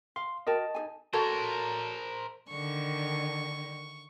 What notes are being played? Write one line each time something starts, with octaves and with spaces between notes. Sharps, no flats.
F5 C6
F#4 A#4 D#5 G5 A5
D#4 G#4 G#5
F#4 A4 A#4 C5 C#5
D3 D#3 C#6